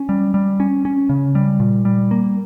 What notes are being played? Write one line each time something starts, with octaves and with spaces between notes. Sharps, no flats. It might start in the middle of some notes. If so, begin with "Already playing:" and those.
Already playing: C#4
G3
G3
C#4
C#4
C#3
G3
A#2
G3
A#3